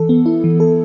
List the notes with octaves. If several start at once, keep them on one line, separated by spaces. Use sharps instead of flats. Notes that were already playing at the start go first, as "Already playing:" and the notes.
Already playing: E3 A4
B3
E4
E3
A4